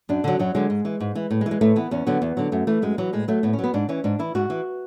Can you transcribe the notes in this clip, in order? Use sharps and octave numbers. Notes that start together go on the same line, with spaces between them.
F#2 D4
D3 F#3
F#2 F#3
D3 F#3 G#3
G#2
E3
G#2
E3
A2
G#3
E3
G#3
A2 A3
E3 B3
E2 C#4
D3 F#3 B3
E2
D3 F#3
F#2 A3
E3 A3
F#2 G#3
E3 F#3
A2 G#3
F#3 A3
A2 B3
C#4
F#3
B3
G#2 D4
E3 C#4
G#2 D4
E3 E4
G#2 F#4
E3